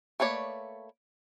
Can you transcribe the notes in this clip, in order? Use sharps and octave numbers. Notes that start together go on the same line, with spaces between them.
A3 A#3 B4 C#5 D5